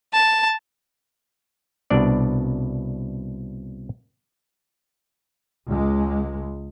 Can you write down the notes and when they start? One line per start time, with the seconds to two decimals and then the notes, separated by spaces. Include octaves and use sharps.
0.13 A5
1.90 C2 B2 D4 D5
5.68 C#2 G#3